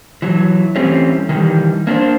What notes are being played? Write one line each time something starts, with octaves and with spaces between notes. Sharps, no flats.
E3 F#3
E3 G3 A3 C4 C#4
D#3 E3 G3
A#3 D4 B4 C5